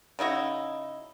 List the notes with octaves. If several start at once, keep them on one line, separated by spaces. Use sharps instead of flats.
C#3 D#4 E4 F#4